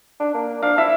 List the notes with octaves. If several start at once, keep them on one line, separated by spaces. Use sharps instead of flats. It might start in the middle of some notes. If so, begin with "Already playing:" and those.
D4
A#3
D4 F5
E4 E5